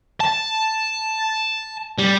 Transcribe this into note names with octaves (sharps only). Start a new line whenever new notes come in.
A5
G3